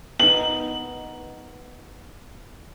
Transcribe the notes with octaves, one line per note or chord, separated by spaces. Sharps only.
B3 D#4 F#7